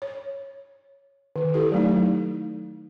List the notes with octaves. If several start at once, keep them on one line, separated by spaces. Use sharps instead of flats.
C#5
D#3
E4 G4 A4
F#3 A3 D#4